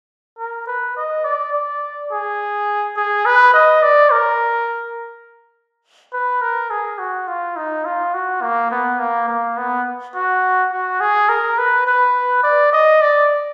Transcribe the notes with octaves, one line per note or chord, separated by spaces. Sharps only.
A#4
B4
D#5
D5
D5
G#4
G#4
B4
D#5
D5
A#4
B4
A#4
G#4
F#4
F4
D#4
F4
F#4
A#3
B3
A#3
A#3
B3
F#4
F#4
G#4
A#4
B4
B4
D5
D#5
D5